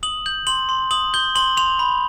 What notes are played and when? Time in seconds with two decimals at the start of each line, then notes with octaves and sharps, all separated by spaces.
0.03 D#6 F#7
0.26 G6 F#7
0.47 C6 F#7
0.69 C6
0.91 D#6 F#7
1.14 G6 G7
1.35 C6 F#7
1.57 C6 F7
1.79 B5